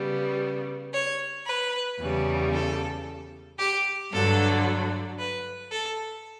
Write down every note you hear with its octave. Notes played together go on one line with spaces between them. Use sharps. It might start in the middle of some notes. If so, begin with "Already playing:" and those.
Already playing: C#3 G3 B3
C#5
B4
E2 C#3 G3 C#4
A4
G4
G2 D3 F#3 A4
B4
A4